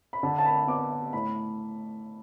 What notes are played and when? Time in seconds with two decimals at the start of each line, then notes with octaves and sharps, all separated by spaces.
0.13 B5
0.23 D3 A5
0.38 A5
0.46 B5
0.67 B3 D6
1.13 A2 B5